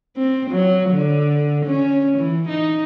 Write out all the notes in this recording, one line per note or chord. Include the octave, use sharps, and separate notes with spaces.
C4
F#3
D3
C#4
E3
D#4